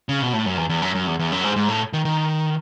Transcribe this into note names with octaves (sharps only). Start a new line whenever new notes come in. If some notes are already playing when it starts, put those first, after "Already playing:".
C#3
B2
A2
F#2
E2
E2
F#2
F#2
E2
E2
F#2
G#2
G#2
A2
D#3
D#3